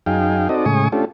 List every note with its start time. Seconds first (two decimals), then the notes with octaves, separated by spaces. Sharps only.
0.06 F#2 D#4 G#4 F5 G5
0.49 C4 D#4 F#4 A4 D5 D#5
0.65 A2 C#3 G#3 G#5 C#6 D#6
0.92 A3 C#4 D4 F4 G4 A4